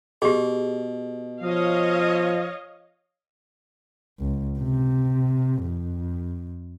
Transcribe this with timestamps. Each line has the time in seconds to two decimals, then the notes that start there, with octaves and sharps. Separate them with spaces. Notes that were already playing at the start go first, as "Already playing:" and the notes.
0.22 B2 G4 G#4
1.43 F3 C#5 D#5 F5
4.20 C#2
4.59 C3
5.63 F2